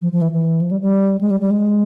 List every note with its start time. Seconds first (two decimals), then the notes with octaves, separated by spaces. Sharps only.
0.02 F3
0.12 F3
0.22 E3
0.32 E3
0.61 F3
0.71 G3
0.81 G3
1.21 G#3
1.30 G3
1.41 G3
1.51 G#3